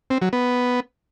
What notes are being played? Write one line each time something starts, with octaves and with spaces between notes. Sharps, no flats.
C4
F#3
B3